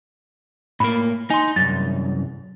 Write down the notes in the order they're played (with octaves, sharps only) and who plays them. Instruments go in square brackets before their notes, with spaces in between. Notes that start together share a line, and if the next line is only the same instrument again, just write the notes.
[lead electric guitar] A2 A#3 [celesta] B5
[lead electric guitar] D#4 [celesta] G#5 C6
[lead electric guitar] C2 F#2 [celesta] A6